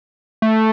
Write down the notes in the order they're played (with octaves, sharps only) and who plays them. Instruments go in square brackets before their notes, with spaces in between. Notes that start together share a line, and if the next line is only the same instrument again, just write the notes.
[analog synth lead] A3